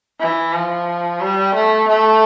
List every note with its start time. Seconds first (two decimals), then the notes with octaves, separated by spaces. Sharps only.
0.20 E3
0.53 F3
1.20 G3
1.55 A3
1.88 A3